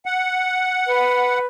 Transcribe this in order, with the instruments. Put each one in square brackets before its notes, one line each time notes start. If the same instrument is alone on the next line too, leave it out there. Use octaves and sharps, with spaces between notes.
[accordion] F#5
[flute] B4